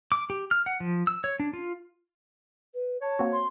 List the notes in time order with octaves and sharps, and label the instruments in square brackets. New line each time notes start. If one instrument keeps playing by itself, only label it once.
[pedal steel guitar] D6
G4
F6
F#5
F3
E6
C#5
D4
F4
[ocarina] B4
[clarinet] C#5 [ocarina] A5
[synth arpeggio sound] A#3 C4 F#4
[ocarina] C6